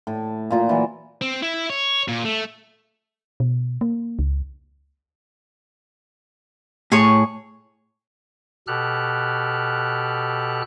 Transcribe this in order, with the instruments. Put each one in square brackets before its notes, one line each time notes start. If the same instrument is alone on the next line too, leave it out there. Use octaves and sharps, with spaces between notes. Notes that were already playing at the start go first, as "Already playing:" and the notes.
[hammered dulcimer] A2
A#2 F4 A#5
E3 F#3
[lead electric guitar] C4
E4
C#5
A#2
A3
[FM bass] B2
A#3
C#2
[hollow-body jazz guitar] A2 [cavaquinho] G#4 C#5 C#6
[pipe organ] B2 G4 A4 F6 F#6